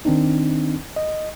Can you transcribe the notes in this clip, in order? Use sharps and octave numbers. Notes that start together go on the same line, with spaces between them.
D#3 C4 D4 D#4
D#5